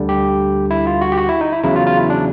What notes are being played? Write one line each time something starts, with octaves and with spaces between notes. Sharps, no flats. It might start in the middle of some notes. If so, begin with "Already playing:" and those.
Already playing: D2 D3 G3
G4
E4
F4
F#4
G4
F#4
E4
D#4
E4
E2 C#3 F#3 E4
F4
F4
E4
D4